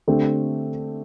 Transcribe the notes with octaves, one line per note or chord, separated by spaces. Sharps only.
D3 A3 C4 G4